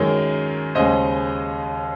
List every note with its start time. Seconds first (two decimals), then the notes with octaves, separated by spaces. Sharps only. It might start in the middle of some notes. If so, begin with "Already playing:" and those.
Already playing: F#2 D#3 G#3 A#4 C#5
0.75 D#2 C#3 G#3 C5 D#5